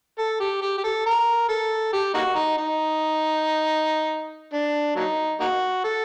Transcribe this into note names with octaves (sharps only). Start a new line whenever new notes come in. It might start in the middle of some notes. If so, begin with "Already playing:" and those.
A4
G4
G4
G4
A4
A#4
A4
G4
A#3 D#4 F#4
D#4
D#4
D4
F#3 A#3 D#4
A#3 D#4 F#4
A4